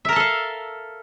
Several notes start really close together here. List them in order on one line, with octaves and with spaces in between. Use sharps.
E5 A#4 A5 A4 F5